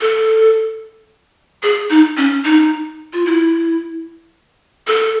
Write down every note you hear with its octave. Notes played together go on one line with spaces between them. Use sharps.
A4
G#4
D#4
C#4
D#4
F4
E4
A4